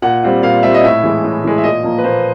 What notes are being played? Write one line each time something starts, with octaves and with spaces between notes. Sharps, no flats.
A#2 F#5
G3 C4 F4
A#2 F5
G3 C4 F4 E5
D#5
A2 E5
E3 G#3
A2
E3 G#3
E5
A#2 D#5
F3 A#3
B4
A#2 C5